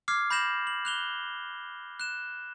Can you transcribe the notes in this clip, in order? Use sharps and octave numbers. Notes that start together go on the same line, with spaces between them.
D6 F6 G#6 C7
B5 G6 A#6 E7 F#7
F#7
F#6 F7 G7
F#6 E7